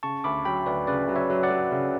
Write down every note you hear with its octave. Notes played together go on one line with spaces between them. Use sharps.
C#3 A5 C#6
D2 B5 D6
F#3 G5 B5
D2 B4 D5
C#3 B4 D5
F#3
C#5 E5
F#3
D5 F#5
F#3
C#3